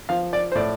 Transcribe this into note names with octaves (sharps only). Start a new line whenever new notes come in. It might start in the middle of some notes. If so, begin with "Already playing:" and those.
F3 F5
D5
C5
A2 D5